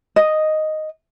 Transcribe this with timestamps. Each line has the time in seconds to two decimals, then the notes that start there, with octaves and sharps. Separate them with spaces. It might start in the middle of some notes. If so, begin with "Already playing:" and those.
0.16 D#5